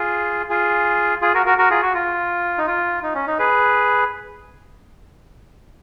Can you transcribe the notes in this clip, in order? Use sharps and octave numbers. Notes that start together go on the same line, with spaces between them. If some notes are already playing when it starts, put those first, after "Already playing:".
Already playing: F4 G#4
F4 G#4
F4 G#4
F#4 A#4
F#4 A#4
F#4 A#4
F4 G#4
F#4
F4
D#4
F4
D#4
C#4
D#4
G#4 B4